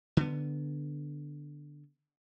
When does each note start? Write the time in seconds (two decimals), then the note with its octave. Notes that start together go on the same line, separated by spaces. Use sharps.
0.17 D3 B3